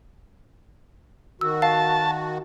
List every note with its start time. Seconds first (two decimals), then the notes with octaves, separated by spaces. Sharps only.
1.41 D#3 F#4 E6
1.62 F5 A5